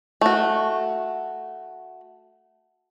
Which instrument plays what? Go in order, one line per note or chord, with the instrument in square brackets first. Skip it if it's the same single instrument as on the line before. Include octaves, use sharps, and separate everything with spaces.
[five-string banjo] A3 F#4